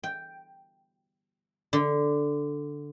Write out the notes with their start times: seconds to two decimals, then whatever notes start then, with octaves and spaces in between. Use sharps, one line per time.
0.04 G5
1.73 D3